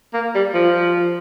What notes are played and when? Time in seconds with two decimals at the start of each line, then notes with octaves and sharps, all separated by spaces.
0.14 A#3
0.35 G3
0.54 F3